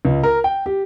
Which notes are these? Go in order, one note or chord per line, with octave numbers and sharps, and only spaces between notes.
C#2
A#4
G5
G4